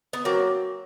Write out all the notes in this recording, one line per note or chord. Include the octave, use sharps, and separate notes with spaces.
B3
F#3 A#3 C4